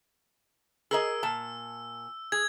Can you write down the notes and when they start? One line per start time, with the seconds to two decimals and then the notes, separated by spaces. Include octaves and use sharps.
0.91 G#4 A#4 D#5 E6
1.23 A#2 A5
2.32 G#4 G#6